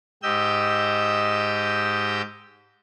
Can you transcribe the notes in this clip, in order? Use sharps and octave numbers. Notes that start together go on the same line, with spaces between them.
G#2 G4 D#5 E6 G6